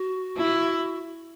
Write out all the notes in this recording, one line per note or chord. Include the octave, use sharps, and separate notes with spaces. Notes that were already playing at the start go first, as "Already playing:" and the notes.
Already playing: F#4
E4